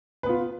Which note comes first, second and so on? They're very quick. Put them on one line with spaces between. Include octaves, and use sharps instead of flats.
B4 B3 F4